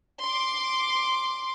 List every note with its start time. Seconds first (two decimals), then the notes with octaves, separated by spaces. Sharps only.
0.22 C6 D6